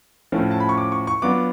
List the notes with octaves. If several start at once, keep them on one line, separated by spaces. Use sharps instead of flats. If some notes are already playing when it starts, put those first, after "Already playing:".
A2 F3 A3 C#4 F4
A5
B5
C#6
D6
C#6
C#6
F#3 B3 D4 F4 D6